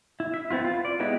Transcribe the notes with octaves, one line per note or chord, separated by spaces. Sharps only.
E4
E5
B3 C4 E4 F4
F4
D5
G#3 B3 D#4 E4 G4